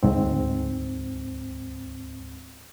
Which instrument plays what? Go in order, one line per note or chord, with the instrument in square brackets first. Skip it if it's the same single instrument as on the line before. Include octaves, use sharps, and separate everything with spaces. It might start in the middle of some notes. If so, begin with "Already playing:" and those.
[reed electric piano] D2 G#2 C4